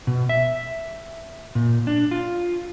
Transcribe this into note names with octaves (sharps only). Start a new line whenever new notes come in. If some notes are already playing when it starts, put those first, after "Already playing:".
B2
E5
A#2
D4
F4